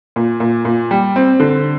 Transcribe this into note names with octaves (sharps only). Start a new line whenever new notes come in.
A#2
A#2
A#2
G3
C4
D3